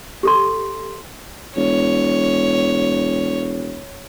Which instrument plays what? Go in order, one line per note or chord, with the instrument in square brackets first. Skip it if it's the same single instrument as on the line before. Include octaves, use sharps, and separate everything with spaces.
[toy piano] G4 A4 C6
[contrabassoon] E1 [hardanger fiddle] C#5